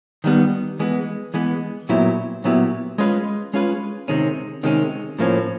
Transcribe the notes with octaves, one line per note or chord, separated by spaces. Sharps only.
D#3 G3 B3
E3 G#3 B3
E3 G#3 B3
A#2 F#3 B3 E4 G4
A#2 F#3 B3 E4 G4
G#3 C#4 F4 G#4 B4
G#3 C#4 F4 G#4 B4
C3 D#3 G#3 C#4
C3 D#3 G#3 C#4
A2 F3 A#3 C#4